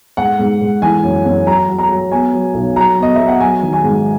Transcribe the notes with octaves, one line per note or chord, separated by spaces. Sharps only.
G#2 F#5
G#2
G#2
E3 G#5
F#2
F#2
F#3 A#5
F#3
A#5
F#3
B3 G#5
F#3
B1
F#3 A#5
B3 D#5
B3 E5
F#5
F#3 G#5
D#3
G#5
G#2